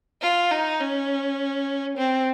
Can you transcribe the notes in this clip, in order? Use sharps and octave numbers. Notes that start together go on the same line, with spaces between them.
F4
D#4
C#4
C4